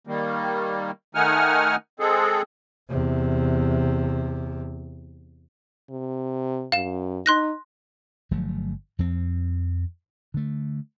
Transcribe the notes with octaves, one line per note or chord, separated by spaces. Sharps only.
D#3 G3 A#3
D#3 A3 D#4 F#5 G#5 F6
G#3 C4 G#4 A4
E2 C3
C3
F#2 F5 E7
D#4 C6 F#6 A#6
G1 F3 F#3 A3
F2 F3 C4
D3 A3